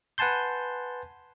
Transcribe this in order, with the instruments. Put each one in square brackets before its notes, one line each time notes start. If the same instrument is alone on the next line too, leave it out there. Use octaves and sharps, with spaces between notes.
[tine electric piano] B4 F#5 G#5 A5 C6 G6